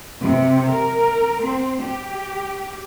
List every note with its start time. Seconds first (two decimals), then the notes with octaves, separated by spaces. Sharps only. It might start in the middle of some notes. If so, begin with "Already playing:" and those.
0.21 C3
0.68 A#4
1.41 C4
1.83 G4